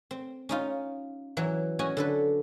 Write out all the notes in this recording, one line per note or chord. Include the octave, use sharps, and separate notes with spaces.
C4
C#4 D#4 F4
E3 F#3
C#4 F#4 D#5 G#5
D3 A4 B4